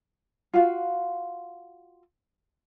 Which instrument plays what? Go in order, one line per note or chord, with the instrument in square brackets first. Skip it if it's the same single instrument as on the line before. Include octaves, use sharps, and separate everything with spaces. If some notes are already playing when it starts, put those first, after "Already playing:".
[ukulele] F4 F#4 F5